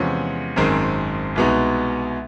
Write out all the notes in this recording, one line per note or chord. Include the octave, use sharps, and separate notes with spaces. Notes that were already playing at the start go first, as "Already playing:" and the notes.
Already playing: E2 C3 F3 G#3 C#4
G#1 F#2 D#3 G#3 C4
C2 B2 G#3 B3 D#4